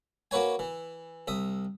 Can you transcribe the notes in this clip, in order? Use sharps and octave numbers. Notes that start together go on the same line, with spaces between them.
A#3 F#4 B4 C#5 G#5
E3
C2 E5 D#6